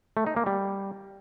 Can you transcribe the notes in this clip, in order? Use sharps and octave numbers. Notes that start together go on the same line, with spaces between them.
A3
D#4
A#3
G3